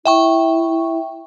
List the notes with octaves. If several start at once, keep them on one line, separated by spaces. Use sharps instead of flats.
E4 E5 G5 C#6